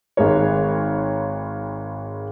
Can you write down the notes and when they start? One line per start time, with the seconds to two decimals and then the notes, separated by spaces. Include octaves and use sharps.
0.17 G#1 G#2 G#3 A#4 C#5